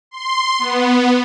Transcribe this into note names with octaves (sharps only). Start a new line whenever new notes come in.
C6
B3